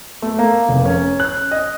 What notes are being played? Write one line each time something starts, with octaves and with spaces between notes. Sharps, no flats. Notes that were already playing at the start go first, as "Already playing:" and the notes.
A3
A#3
F1
C#4
F#6
D#5